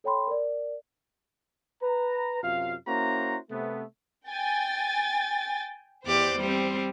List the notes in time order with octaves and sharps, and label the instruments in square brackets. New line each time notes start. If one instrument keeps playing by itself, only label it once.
[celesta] A4 C#5 G5 B5 C6
A#4 D5
[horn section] B4 A#5
F#2 C3 F4 F5
A#3 C#4 E4 F#4 C5 A#5
C3 A3 B3
[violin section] G5 G#5 A6
[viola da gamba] E2 G4 D5 [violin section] C5
[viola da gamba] G3 C4